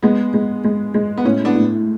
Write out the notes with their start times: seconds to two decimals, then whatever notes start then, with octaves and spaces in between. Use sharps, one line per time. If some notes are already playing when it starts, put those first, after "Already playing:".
0.03 G#3 B3
0.34 G#3
0.64 G#3
0.94 G#3
1.18 B3
1.25 A2 C#4
1.45 B3 D4
1.55 A2